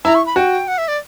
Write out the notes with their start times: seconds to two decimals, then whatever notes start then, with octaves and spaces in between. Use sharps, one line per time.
0.05 E4 A#5
0.15 C#6
0.26 B5
0.36 F#4 G5
0.68 F#5
0.78 E5
0.88 D5